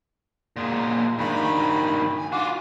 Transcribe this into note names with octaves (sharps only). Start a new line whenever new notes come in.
A#2 G#3
G2 D#3 B5
G#5
F4 F#4 D6